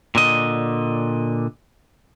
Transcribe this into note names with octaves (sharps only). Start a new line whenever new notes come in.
A#2 D3 D#5